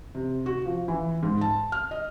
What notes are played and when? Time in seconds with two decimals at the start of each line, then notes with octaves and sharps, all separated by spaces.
0.15 C3
0.46 F#4
0.66 F3
0.88 E3
1.23 G#2
1.41 A5
1.72 F6
1.91 D#5